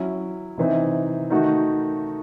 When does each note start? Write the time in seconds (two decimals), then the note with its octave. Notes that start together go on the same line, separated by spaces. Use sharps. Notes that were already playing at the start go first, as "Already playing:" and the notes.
Already playing: F#3 C#4 E4
0.58 C3 E3 C4 D#4
1.30 D#3 A3 D#4 F#4